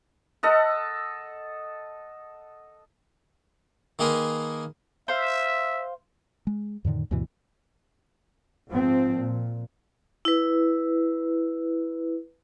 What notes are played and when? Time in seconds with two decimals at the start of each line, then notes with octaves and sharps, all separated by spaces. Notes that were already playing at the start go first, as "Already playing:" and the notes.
0.43 A4 D#5 F#5
3.99 D#3 A#3 G#4 A#4 B4 C6
5.08 C5 E5 F5
6.47 G#3
6.85 F2 A2 D3 D#3
7.11 D2 G2 B2 E3
8.69 G#2 F3 C4
9.15 A#2
10.25 E4 B4